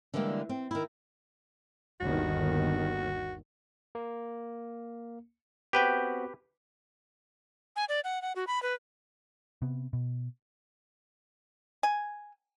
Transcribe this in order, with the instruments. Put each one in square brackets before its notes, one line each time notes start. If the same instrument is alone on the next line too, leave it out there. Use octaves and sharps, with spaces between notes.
[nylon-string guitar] D3 E3 G3 G#3 A#3
C4
D#3 E4
[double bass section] G1 D#2 D#3 [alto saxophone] F#4
[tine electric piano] A#3
[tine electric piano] B3 C4 F#4 [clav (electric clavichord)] G4 B4 G5
[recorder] G#5
D5
F#5
F#5
F#4
B5
B4
[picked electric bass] C3 B3
B2
[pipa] G#5